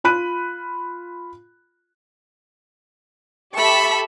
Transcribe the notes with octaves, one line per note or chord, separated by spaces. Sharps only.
F4 B5 F#6 D#7
G4 A4 E5 B5 C#6